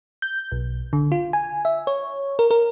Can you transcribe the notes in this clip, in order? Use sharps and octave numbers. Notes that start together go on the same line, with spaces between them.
G6
B1
D3
F4
G#5
E5
C#5
A#4
A#4